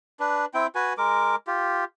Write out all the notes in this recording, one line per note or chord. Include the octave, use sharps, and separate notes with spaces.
D4 B4
C4 E4 G5
F#4 B4 G#5
G#3 A#4 D6
F4 G4